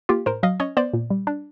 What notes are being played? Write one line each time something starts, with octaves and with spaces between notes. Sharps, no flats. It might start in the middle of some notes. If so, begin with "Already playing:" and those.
A#3 F4 G4
A2 A#4 C5
F#3 D#5 F5
C#4 C#5 D#5
B3 C5 D5
A#2
G3
D4